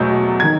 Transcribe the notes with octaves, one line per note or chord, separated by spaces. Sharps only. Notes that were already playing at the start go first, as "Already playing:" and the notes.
Already playing: E2 B2 F#3 A3 G6
D#3 G#6